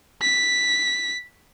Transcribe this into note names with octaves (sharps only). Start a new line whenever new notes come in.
B6